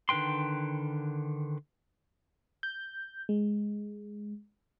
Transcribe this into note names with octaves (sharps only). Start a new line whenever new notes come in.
D3 D#3 B4 G5 C6
G6
G#3